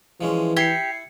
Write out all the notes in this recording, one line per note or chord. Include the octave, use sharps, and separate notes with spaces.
E3 F3 G#3 C#4
E4 G4 G#6 C7 C#7